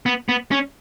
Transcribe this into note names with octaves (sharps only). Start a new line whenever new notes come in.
B3
B3
C#4